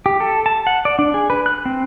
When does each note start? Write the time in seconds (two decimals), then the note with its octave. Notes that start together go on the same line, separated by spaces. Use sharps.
0.06 G4
0.20 A4
0.46 A5
0.67 F#5
0.85 D5
0.99 D4
1.14 G#4
1.30 B4
1.46 F#6
1.66 C4